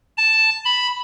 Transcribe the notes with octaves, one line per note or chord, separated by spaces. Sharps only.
A5
B5